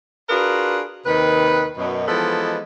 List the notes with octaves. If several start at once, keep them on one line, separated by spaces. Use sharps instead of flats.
D4 F4 F#4 G#4 A#4 B4
D#2 C3 D#3 B4
F#2 B2
E3 F3 G#3 B3 D#4 A4